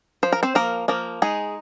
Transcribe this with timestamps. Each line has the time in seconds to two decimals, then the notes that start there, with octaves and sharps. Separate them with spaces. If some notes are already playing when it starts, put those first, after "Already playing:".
0.23 F3 C5
0.32 A#4
0.43 C4 C5
0.55 F3 A#3 A#4
0.88 F3 A#3 A#4
1.22 G#3 D#4 G#4